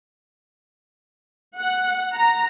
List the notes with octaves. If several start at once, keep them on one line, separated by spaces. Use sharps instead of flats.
F#5
A#5